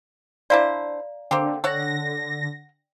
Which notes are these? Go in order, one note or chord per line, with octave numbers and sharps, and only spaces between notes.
D4 E4 C5 D5 F5 A#5
D3 A#3 C4 G4 G5
D3 A4 C#5 F#5 A#6